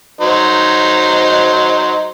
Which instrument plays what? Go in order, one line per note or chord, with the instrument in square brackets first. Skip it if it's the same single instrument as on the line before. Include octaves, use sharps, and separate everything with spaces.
[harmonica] F#3 D#4 C5